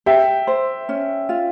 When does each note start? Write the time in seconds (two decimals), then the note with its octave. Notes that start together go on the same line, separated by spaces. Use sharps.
0.06 G4 E5 G5
0.47 C5
0.89 C#4
1.29 F4